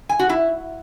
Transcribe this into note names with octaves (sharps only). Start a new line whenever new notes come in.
G#5
F#4
E4